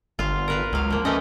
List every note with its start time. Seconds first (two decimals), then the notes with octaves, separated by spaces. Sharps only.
0.19 G1 F4 F5
0.48 A#4 B4 F5
0.73 C#2 F#3 F5
0.90 F3 A#3
1.05 E3 A3 C#4 D#5